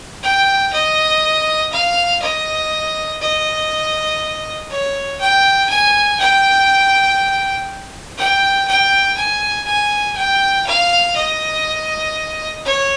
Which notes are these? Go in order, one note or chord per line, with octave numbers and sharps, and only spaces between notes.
G5
D#5
F5
D#5
D#5
C#5
G5
G#5
G5
G5
G5
G#5
G#5
G5
F5
D#5
C#5